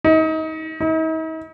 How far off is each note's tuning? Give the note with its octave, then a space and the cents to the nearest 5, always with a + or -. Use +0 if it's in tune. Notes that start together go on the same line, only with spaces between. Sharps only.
D#4 +30
D#4 +45